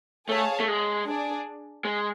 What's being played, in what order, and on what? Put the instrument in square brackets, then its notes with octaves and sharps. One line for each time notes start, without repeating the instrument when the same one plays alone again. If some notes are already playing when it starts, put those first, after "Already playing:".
[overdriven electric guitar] A3 [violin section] G#4 C#5 F5 A5
[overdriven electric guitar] A3
G#3
[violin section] D4 G#4 D5
[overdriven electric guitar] G#3